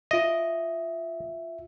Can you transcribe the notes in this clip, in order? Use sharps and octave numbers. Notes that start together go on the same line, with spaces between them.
F4 D#5 E5